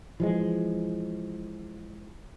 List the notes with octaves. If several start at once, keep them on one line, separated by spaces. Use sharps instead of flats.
E3 F3 G#3